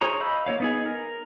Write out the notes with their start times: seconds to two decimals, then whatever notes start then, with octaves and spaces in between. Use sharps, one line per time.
0.01 G#4 C5 C#5 A#5
0.20 D#5 F5 B5 E6 G6
0.46 A#3 D4 C#5 F5
0.60 B3 D#4 G#4
0.86 A#4